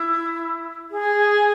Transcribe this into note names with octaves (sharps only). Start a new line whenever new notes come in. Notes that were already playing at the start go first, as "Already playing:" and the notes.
Already playing: E4
G#4